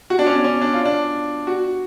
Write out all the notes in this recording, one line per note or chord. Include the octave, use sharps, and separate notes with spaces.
F#4
D4
C#4
D4
C#4
D4
F4
D4
F#4